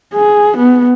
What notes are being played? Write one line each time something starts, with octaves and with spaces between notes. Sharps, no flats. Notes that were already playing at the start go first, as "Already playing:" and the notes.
G#4
B3